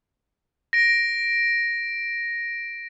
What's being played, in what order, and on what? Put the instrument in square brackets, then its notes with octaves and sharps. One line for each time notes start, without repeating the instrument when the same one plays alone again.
[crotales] A#6 D7